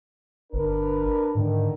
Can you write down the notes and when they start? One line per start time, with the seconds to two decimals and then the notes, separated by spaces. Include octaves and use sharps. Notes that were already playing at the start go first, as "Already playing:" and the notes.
0.53 G1 D4 A#4 B4
1.35 G#2 D3 D#3